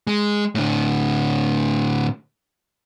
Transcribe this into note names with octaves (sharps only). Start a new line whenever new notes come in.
G#3
A2 D3